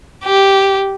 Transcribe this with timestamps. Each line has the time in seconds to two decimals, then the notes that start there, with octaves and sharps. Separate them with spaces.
0.25 G4